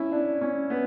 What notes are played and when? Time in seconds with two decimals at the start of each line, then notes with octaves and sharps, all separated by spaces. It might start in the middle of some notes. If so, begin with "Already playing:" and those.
Already playing: C#4 E4
0.12 D4
0.41 C#4
0.70 B3